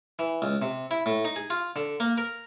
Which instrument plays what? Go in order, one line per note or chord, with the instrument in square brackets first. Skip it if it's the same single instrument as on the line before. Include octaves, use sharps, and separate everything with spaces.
[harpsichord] E3
C#2
C3
E4
A2
D#4
G#4
F4
D3
A#3
A#4